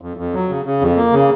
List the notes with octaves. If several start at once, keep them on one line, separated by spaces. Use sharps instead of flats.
F2
F2
F#3
C#3
C#3
F2
A#3
C#3